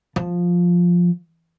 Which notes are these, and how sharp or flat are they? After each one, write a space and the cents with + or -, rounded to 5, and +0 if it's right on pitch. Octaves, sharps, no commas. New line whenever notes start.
F3 +5